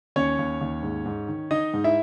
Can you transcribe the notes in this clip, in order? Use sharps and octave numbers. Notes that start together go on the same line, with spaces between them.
D#2 C#4 C#5
D#2
D#2
G#2
G#2
D#3
D#3 D#4 D#5
G#2
E4 E5